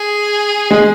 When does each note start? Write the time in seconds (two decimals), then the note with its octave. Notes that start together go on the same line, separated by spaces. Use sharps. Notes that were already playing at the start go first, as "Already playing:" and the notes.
Already playing: G#4
0.71 G#3